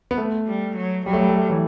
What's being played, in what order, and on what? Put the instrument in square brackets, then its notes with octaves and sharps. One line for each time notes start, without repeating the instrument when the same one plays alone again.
[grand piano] B3
A3
[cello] G3
F#3
[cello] F#3 [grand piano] G3
[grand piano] A3
G3
A3
G3
E3